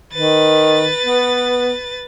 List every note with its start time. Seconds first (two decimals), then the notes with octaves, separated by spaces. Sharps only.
0.13 D#3 B4 A6
1.04 B3